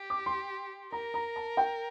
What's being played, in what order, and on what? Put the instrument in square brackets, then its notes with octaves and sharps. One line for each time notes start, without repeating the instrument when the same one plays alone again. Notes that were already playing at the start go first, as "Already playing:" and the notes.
Already playing: [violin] G4
[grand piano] D6
C6
[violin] A#4 [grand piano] A#5
[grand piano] A#5
A5
G5